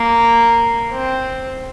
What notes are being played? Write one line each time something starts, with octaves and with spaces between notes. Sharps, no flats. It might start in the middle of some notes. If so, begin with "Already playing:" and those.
Already playing: A#3
C4